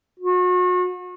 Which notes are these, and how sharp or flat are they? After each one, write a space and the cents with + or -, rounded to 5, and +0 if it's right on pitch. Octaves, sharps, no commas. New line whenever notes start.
F#4 -40